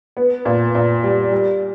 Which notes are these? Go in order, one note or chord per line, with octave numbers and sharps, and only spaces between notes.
B3
A#2
A#2
G3
G3